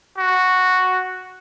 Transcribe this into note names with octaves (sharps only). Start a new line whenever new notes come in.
F#4